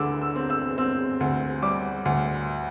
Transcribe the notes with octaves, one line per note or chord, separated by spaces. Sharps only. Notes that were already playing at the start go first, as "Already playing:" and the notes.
Already playing: D2 D3 D6 E6
E6
C4
E6
C4 E6
D2
G3 D6
D2